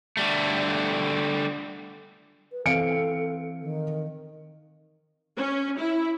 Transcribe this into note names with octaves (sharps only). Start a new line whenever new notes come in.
D3 G3 A3
B4
E3 C4 A4 F5 C#7 D7
D#3
C#4
E4